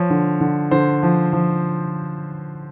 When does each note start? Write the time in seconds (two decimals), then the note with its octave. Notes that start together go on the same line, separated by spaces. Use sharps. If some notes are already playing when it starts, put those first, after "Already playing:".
Already playing: F3 C#5
0.10 D3
0.41 D3
0.71 D3 C5
1.03 F3
1.33 F3